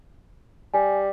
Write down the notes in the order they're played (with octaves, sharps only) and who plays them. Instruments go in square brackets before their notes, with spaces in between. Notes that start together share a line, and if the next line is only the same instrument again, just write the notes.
[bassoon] G3 [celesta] G#5